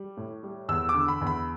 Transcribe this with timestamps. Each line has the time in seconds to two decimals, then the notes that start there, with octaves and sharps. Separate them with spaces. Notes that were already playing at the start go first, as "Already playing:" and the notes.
Already playing: G3
0.17 A2
0.43 G3
0.69 E2 E6
0.89 D6
0.94 D3
1.08 B5
1.21 E2
1.27 B5